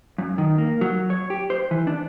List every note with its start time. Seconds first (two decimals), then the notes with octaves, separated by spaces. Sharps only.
0.18 F#2
0.38 D#3
0.58 A#3
0.81 F#3
1.10 C#5
1.30 G4
1.50 C5
1.71 E3
1.87 D4